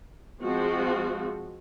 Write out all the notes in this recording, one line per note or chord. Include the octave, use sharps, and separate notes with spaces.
F3 G#3 C4 F#4